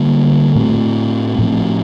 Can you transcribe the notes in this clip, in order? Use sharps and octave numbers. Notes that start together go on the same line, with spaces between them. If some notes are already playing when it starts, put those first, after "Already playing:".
Already playing: D3 G3 A#3
A2 A3 C4
A2 F3 A3 C4